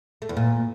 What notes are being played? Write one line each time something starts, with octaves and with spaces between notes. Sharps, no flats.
A3
E2
A#2